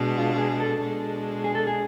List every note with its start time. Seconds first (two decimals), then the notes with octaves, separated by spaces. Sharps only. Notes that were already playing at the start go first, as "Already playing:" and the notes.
Already playing: B2 G#3 D4
0.18 F4
0.38 G#4
0.60 A4
0.81 B2 G#3 D4
1.44 G#4
1.55 A4
1.67 G#4